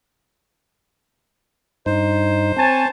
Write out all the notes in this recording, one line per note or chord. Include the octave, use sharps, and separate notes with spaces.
G2 D#4 C5
C4 C#5 G#5 A5